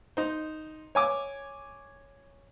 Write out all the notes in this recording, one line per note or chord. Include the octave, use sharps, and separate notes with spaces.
D#4 C5
C#5 G#5 D6